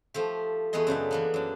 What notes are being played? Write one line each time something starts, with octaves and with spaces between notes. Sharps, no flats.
F3 A3 G4
E2 A3 B3 G#4 D#5
F#2 C#3 D4 E5
E3 A#3 B3
F#2 D4